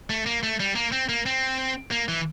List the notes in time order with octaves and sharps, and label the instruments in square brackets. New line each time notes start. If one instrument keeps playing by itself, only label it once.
[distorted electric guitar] A3
A#3
A3
G3
A#3
C4
A#3
C4
A#3
E3